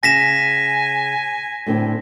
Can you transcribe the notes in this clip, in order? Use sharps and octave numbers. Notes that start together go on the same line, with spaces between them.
C#3 G#5 A#6 B6 E7
A2 D3 C4